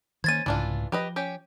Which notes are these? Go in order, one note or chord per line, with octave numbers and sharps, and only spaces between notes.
D#3 A#3 C#4 C5 G#6 A6 D#7
C2 G#2 C#3 E3 D4 F4
F3 G4 B4 D#5
C#4 G4